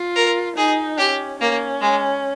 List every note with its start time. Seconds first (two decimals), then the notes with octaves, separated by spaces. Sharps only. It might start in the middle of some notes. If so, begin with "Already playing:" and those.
Already playing: F4
0.16 A#4
0.57 D#4 G#4
0.98 C#4 G4
1.40 A#3 C#4
1.81 G#3